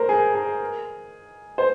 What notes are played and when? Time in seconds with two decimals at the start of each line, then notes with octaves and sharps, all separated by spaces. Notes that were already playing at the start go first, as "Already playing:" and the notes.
Already playing: A#4 C5
0.09 G#4
0.35 G#4
1.58 C5